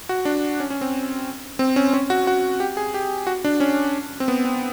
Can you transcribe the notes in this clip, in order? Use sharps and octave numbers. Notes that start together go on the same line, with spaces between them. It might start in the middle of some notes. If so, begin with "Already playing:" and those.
F#4
D4
C#4
C#4
C4
C4
C#4
C#4
F#4
F#4
G4
G#4
G4
F#4
D4
C#4
C4
B3
C4